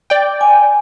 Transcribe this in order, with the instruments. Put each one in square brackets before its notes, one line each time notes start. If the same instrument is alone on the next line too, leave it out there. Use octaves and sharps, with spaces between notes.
[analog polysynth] D5 G5
[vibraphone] G#5